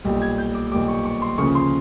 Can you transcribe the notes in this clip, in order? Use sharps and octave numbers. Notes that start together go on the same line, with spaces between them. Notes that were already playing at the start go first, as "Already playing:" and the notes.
B1 A#2 G3
G#6
G6
D6
B1 A#2 G3 D6
C#6
C#6
C6
D2 C#3 F3 A#3 C#6
C6